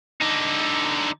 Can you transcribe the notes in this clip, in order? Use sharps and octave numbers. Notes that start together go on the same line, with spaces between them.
D3 D#4